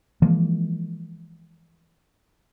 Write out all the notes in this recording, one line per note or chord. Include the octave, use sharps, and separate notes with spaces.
E3 F3 G#3 A#3